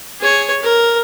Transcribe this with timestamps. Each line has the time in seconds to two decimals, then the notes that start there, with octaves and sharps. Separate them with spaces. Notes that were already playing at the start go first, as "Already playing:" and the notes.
0.20 G#4 C#5
0.62 A#4